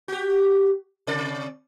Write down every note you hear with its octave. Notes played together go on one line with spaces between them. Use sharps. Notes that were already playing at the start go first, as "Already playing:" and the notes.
F#4 G4
C3 D5